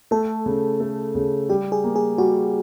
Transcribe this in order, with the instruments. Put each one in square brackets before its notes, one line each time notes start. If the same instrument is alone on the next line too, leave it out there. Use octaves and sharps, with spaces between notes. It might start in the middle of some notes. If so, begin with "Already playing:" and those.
[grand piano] A3 [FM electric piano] A4
[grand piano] C#3
A3
C#3
[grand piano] G3 [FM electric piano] G4
[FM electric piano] G#4
[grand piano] A#3
[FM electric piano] G#4
[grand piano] G3 [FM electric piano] F#4